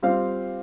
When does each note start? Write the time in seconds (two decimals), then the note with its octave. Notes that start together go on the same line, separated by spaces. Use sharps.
0.02 G3 C4 F4 C5 F5